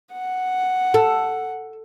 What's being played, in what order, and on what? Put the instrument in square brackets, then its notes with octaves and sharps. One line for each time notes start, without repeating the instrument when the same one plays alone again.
[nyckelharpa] F#5
[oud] A4